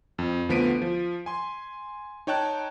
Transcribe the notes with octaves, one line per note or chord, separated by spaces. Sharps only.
F2
D2 F3 B3 B6 D7 D#7
F3
G#5 C6
D#4 C#5 G5 A5 F#6